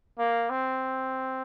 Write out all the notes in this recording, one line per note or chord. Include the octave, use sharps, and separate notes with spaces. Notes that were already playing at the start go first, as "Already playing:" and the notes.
A#3
C4